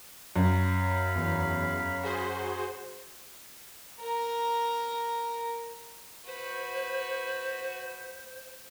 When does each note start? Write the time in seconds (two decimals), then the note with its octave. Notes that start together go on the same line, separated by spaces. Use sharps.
0.36 F#2 C#5 F5 B5
1.16 E2
2.03 F#4 G#4 C5
3.99 A#4 A#5
6.27 F#4 B4 C5